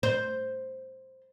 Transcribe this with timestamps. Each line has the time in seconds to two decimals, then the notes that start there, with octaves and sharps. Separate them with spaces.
0.03 C5